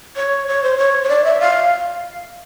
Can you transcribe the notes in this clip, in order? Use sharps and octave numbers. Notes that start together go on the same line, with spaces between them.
C#5
C#5
C5
C#5
C#5
D5
E5
F5